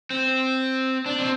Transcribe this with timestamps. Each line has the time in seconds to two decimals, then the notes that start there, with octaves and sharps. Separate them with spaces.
0.10 C4
1.06 D4
1.20 C4